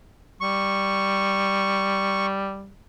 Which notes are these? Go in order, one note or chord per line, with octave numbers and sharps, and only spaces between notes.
G3 C#6